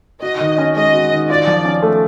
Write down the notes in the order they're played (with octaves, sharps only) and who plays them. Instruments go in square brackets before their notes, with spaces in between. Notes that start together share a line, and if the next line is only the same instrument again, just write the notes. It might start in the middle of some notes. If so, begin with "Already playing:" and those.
[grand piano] F#4 [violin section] D#5
[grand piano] D#3
C#4
[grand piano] G#3 [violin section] D#5
[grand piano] F#4
D#3
[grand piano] F4 [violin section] D5
[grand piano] F3
C#4
A3